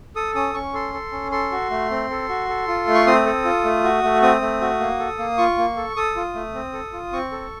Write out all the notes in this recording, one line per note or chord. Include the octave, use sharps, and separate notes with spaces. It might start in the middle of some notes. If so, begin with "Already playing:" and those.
A4 D#6
C#4 D#6
C#4 C#6
A4 C6
A4
C#4
A4 C6
F#4
A3
C4
A4
F#4
A4
F4
A3
C#6
C4 D#6
A4
F4
A3
F#4
A3
C4 D#6
A3
F#4
A#3
A4
A#3
F4 C#6
A#3
A4
A4 D#6
F4
A3
C4
A4
F4
C4 C#6
A4